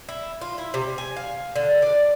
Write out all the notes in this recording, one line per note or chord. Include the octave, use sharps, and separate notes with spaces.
E4
F4
E4
C3
G#5
F5
D3
D5